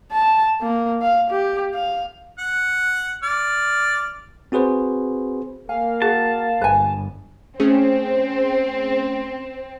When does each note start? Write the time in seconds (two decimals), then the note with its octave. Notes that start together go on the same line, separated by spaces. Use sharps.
0.12 A5
0.61 A#3
1.02 F5
1.30 G4
1.74 F5
2.39 F#5
3.23 D5 F6
4.52 C4 F#4 G#4 B4 C5
5.69 A#3 F5 G#5
6.02 F#4 G#4 A5
6.61 G1 B4 G#5
7.60 A3 C4 C#4 G#4